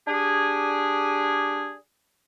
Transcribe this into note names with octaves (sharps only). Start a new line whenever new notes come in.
D4 G4 G#4